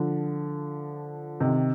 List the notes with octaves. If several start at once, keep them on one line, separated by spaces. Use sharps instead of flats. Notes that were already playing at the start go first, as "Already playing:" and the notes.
Already playing: D3 F3
C3 D#3